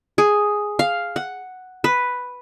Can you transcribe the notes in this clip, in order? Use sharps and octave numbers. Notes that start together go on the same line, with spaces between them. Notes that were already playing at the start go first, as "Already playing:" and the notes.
G#4
F5
F#5
B4